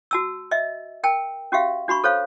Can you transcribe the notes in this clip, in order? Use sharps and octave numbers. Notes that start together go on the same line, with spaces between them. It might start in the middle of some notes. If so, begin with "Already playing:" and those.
F#4 A5 E6
D#5 E5
A#4 G5 A5
C#4 F#4 G4 E5 F5
D4 F#4 B5 C#6
A4 C5 C#5 F5